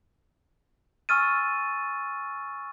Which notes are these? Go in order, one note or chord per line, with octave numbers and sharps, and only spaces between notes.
G#5 C#6 E6 F6 A6 D#7